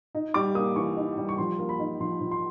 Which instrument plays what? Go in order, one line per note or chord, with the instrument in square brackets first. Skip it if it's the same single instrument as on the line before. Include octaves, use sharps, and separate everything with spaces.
[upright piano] D#4
G3 D6
A#3 D#6
E3 C#6
D#4
G3
C#6
F3 C6
A#3
B5
D#4
F3 C6
F3
C6